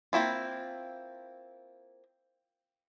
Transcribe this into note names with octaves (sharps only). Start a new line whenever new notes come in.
A#3 C4 E4 F4